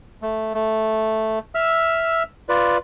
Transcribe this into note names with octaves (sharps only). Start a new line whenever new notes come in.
A3
A3
E5 E6 F6
F4 B4 D5